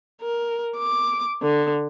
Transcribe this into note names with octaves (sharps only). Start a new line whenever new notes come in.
A#4
D6
D3